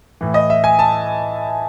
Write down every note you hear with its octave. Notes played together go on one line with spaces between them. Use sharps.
A2 E3
D#5
E5
G#5
A5